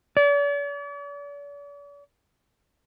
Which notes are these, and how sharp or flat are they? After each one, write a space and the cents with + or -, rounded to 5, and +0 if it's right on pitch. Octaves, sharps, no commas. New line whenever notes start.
D5 -45